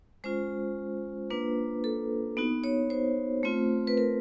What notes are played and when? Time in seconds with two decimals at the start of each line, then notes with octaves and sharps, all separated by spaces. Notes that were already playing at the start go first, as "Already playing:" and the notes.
0.24 G#3 C#4 F4 C5
1.30 A#3 D4 F4 B4
1.84 A4
2.37 B3 D#4 F#4
2.64 C#5
2.90 C5
3.43 A3 C4 F4
3.87 B4
3.97 A#4